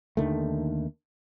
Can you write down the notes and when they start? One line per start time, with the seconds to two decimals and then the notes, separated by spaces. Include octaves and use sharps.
0.17 D#2 D3 D#3 A3